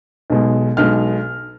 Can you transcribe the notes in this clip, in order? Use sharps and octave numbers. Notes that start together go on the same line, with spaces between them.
B1 B2 G#3
B1 B2 G#3 F6